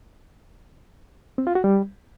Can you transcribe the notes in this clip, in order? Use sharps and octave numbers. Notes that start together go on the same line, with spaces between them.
C4
F4
F#4
G3